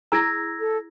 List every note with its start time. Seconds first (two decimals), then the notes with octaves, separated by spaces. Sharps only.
0.12 E4 G#4 A#5 E6 G#6 A#6
0.60 A4